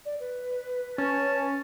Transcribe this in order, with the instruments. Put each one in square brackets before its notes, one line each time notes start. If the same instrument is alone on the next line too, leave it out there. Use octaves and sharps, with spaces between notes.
[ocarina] D5
B4
[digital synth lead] C#4 [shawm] A5